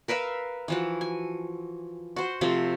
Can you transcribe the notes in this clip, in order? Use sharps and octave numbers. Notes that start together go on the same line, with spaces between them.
A#4 B4 E5 F5
E3 F3 F#4
G#5
F#4 C5
C3 F3 A3